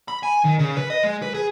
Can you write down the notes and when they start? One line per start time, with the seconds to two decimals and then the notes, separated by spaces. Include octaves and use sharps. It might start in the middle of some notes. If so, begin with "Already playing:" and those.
0.08 B5
0.23 G#5
0.44 D#3
0.59 C#3
0.77 B4
0.90 D#5
1.03 G#3
1.22 B4
1.34 G#4